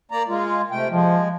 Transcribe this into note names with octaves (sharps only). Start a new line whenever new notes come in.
A#3 D5 A#5
G#3 F4
C3 A3 G5
F3 G#3